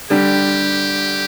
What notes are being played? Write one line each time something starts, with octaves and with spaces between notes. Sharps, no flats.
D3 G3 G4